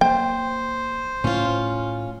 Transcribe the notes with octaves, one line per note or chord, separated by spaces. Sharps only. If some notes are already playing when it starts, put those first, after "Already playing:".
F#3 A#3 C5 G5
A2 C#4 F4